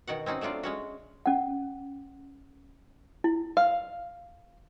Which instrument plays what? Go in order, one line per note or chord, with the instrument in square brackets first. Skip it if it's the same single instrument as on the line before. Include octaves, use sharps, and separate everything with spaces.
[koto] B2 D#3 F#4 F#5
C4 C#4 D#4 F#4
F#3 A3 D4 F4 D5
G#3 C#4 F#4
[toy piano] C#4 F#5
E4
[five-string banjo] F5